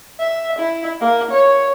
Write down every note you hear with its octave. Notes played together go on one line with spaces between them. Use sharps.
E5
E4
A#3
C#5